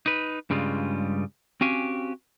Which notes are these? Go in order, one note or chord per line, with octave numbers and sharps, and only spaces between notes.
D#4 B4
G2 C#3 G3 G#3 F4
C4 C#4 F#4 G4 F5 G#5